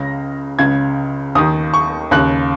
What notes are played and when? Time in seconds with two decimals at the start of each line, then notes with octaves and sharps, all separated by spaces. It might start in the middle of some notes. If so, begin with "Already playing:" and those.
Already playing: C#2 C#3 A#6
0.59 C#2 C#3 G#6
1.35 D#2 D#3 D#6
1.74 C#6
2.11 D#2 C#3 F#6